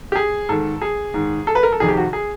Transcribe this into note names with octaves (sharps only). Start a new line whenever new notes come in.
G4
G#4
G#2 D#3 A4
G#4
G#2 D#3
A4
B4
A#4
A4
F2 C3 D#3 G#4
G4
F#4
G#4